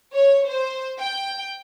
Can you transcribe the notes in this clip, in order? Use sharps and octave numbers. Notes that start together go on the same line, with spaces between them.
C#5
C5
G5